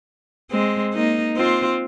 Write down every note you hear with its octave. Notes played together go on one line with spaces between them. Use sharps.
G#3 C4
A#3 D#4
C4 F4